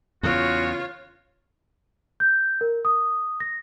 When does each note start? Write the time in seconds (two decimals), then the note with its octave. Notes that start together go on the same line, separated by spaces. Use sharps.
0.23 E2 C#3 F4 F#4 C#5
2.20 G6
2.61 A#4
2.85 D#6
3.40 A#6